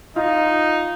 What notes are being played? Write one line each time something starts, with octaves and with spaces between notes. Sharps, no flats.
D#4 F4